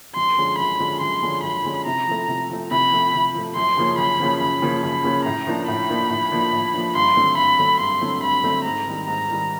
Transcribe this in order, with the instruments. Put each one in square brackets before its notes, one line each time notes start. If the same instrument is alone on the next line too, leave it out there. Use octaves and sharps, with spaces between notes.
[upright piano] F#2 [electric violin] C6
[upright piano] D3 F3 G#3 C#4
[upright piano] F#2 [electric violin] B5
[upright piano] D3 F3 G#3 C#4
[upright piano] F#2 [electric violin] C6
[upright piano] D3 F3 G#3 C#4
[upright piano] F#2 [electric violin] B5
[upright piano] D3 F3 G#3 C#4
[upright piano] C3 [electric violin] A#5
[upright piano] F3 A3
C3
F3 A3
[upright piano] C3 [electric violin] B5
[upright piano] F3 A3
C3
F3 A3
[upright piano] F#2 [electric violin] C6
[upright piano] C#3 F3 A#3 C#4
[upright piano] F#2 [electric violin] B5
[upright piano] C#3 F3 A#3 C#4
[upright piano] F#2 [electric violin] B5
[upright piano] C#3 F3 A#3 C#4
[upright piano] F#2 [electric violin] B5
[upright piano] C#3 F3 A#3 C#4
[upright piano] A2 [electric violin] A#5
[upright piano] F3 A#3 D4
[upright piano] A2 [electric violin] B5
[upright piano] F3 A#3 D4
A2
F3 A#3 D4
A2
F3 A#3 D4
[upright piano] G2 [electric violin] C6
[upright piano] D3 F#3 A3 C4
[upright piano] G2 [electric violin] B5
[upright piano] D3 F#3 A3 C4
[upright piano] G2 [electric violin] C6
[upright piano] D3 F#3 A3 C4
[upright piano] G2 [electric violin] B5
[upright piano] D3 F#3 A3 C4
[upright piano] G#2 [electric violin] A#5
[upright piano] D#3 G3
[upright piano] G#2 [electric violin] A#5
[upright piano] D#3 G3